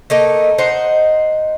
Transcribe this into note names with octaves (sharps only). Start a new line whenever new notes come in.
A3 A#3 D#4
D#4 C5 F#5